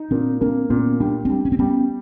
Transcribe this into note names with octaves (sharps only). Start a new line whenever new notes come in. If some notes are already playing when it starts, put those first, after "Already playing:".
Already playing: D#4
A#2 C4 D4
A#3 C4 D4
A#2 B3 C#4
G3 D4
G3 C4 D4
C#4
C4
G3 B3 C#4